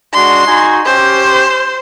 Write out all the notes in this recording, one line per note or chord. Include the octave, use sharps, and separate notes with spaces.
G#3 D4 F#4 C6
D#4 F#4 G#5
C#4 G4 C5